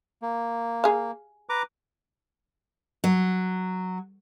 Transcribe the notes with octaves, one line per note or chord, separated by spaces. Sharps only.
A#3
G#4 F5
B4 A#5 D6
F#3